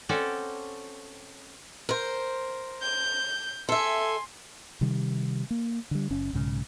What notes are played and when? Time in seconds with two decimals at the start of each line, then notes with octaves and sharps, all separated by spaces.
0.09 C4 C#4 F#4 A4 D5
1.89 A#4 C5
2.82 G6
3.69 A4 E5 G#5 C6
4.81 C3 D#3 G3
5.50 A#3
5.91 D3 G3
6.10 F#1 C#4
6.33 B1 G#2 C#3